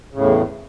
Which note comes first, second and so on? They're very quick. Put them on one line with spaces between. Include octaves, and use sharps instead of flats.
C#3 A2 E2